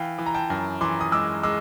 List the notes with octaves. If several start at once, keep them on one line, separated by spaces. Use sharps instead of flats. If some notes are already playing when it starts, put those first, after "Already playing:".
Already playing: E3 F5 G5
E3
A#5
G5 A5
F#2
E3 C6 D6
D#6
G#3 D6 E6
G#3 D6 E6